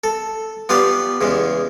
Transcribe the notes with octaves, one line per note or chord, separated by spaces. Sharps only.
A4
B3 F4 G4 D5
E2 C#3 G#3